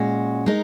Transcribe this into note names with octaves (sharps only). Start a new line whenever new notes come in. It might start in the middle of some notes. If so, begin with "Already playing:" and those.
Already playing: A#2 G#3 C#4 F#4
G#3 D#4 A#4